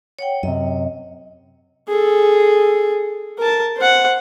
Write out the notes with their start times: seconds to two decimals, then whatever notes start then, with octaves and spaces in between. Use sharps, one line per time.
0.19 C#5 F#5 G5
0.43 F#2 C3 D#5
1.89 G#4 A4
3.38 A#4 A5
3.77 C5 F#5